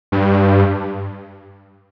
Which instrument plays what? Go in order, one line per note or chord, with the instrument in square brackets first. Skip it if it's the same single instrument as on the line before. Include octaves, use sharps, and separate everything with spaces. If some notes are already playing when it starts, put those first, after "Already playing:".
[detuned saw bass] G2